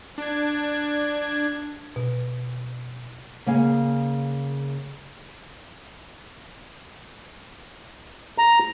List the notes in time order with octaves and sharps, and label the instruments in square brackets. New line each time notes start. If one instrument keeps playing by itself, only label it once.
[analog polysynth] D4 G#6
[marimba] B2
[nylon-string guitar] C#3 A#3 F5 G#5
[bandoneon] A#5